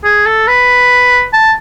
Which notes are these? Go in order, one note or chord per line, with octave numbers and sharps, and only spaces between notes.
G#4
A4
B4
A5